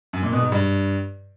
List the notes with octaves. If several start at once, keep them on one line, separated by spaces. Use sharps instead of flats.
F#2
A#2
B2
G#2
G2